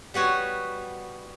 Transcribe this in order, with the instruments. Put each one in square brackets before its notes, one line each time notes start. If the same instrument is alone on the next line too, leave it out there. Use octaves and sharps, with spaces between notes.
[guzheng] G3 B3 F#4 C#5